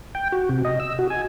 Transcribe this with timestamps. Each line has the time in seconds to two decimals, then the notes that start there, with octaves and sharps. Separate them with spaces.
0.15 G5
0.32 F#4
0.49 C3
0.65 D#5
0.80 E6
0.99 F#4
1.10 G#5